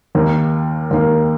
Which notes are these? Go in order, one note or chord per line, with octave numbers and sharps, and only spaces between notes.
D#2 D#3 A#3
D#2 D#3 A#3